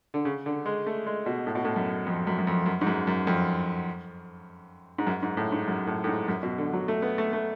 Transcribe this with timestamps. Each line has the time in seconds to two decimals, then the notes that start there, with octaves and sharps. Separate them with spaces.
0.14 D3
0.25 C#3
0.46 D3
0.66 G#3
0.86 A3
1.06 G#3
1.26 B2
1.47 A2
1.55 B2
1.65 A2
1.76 F#2
2.06 F2
2.27 F#2
2.38 F#2
2.47 F2
2.66 F#2
2.81 G#2
2.87 F#2
3.07 F#2
3.27 F2
4.98 G#2
5.07 F#2
5.23 G#2
5.37 A2
5.52 G#2
5.68 F#2
5.87 A2
6.04 A2
6.07 G#2
6.28 F#2
6.43 B2
6.58 D3
6.73 F#3
6.88 A3
7.02 B3
7.18 A3
7.33 A3